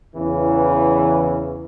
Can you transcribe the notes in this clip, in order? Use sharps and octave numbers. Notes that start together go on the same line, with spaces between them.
E2 C#3 E3